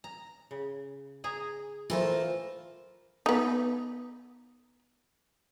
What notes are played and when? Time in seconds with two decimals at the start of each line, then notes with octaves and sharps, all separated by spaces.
0.04 A#5
0.51 C#3
1.24 G#4 G#5 A#5
1.90 E3 A3 F4 A#4 C5
3.26 B3 D#4